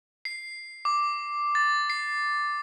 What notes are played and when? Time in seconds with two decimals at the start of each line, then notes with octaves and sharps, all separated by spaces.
0.25 C7
0.85 D6
1.55 A6
1.90 C7